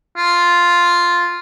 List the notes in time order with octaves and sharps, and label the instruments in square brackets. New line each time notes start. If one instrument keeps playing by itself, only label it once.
[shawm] F4